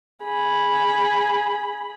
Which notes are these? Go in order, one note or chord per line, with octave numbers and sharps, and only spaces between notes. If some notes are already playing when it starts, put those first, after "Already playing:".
G#4 B5